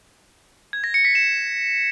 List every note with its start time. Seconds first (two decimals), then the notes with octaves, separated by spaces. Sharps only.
0.73 G#6
0.84 A#6
0.94 C#7
1.05 B6
1.15 E7